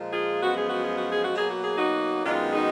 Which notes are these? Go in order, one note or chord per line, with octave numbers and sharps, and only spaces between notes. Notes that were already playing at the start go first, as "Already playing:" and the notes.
Already playing: A#2 F3 G#3
F4 G#4
F#2 F3 G#3 B3 F#4
G#4
F#4
G#4
F#4
G#4
F#4
B2 F#3 A#3 G#4
F#4
G#4
D#4 F#4
F#2 D#3 G#3 B3 D4 F4
G#4
D#4 F#4